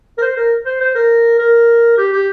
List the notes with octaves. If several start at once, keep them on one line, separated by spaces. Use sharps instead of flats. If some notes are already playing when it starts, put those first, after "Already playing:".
A#4
C5
A#4
C5
C5
A#4
A#4
G4
G4